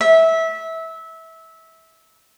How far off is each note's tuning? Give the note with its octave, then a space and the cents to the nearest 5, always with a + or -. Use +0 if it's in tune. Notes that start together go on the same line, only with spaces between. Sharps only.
E5 -20